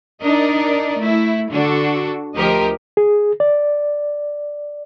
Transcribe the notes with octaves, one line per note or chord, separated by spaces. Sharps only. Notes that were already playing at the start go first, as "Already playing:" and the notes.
D4 D#4 A#4 D5 D#5
A3 E4
D3 D4 F#4 A4
D2 F3 G4 A#4 D#5
G#4
D5